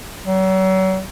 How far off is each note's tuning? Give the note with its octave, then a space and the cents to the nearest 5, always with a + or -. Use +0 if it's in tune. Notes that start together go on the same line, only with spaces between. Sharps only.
F#3 +40